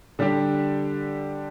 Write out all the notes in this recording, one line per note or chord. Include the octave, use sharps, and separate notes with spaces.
D3 G3 D4 G4